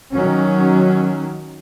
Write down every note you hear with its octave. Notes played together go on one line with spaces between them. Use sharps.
D#3 F#3 C#4